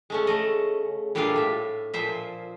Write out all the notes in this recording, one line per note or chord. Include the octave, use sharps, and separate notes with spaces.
G#3 A3 C#4
C#3 A3 D#5
A#2 G3 A3 D4 G#4 F5
A2 E5
A#2 F3 C5 E5